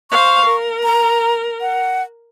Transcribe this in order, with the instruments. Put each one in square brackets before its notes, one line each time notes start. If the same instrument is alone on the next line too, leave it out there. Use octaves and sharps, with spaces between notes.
[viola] C5 F5 [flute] C#6
[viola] A#4
[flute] A#5
F#5